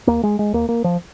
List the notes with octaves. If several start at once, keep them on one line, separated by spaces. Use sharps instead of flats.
D#2 A#3
G#3
G#3
D#2 A#3
A#3
F3